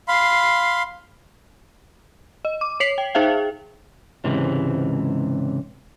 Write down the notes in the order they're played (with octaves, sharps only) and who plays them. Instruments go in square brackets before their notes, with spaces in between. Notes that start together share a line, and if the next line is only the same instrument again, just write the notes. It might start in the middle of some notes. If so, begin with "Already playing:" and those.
[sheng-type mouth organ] F5 B5 C6
[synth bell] D#5
D6
C#5 B6 C7 F7 F#7
G5
D#4 G#4 C5 E5 F5 G5
[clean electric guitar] C#2 G#2 C3 E3